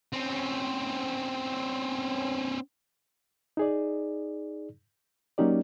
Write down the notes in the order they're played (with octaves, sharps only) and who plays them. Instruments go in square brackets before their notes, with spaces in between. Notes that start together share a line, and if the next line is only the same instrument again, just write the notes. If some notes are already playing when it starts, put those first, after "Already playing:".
[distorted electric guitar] C4 C#4
[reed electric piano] D#4 G#4 D5
F#3 A#3 C#4 D#4 G4 D5